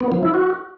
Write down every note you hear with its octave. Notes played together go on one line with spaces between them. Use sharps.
B3
F3
E4
F#4